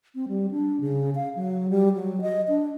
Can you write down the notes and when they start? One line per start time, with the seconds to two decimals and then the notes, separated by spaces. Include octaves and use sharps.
0.15 C4
0.28 G3
0.51 D4
0.80 C#3
1.15 F5
1.36 F#3
1.70 G3
1.95 F#3
2.21 D#5
2.48 D4